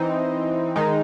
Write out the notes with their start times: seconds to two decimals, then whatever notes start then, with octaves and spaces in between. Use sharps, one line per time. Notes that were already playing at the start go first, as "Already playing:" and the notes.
Already playing: E3 C4 D#4
0.76 D#3 G#3 D#4